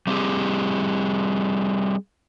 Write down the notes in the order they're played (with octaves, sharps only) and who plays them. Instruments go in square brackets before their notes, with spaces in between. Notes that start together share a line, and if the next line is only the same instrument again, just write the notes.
[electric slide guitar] G3 C4 E4 F4 G4 G#4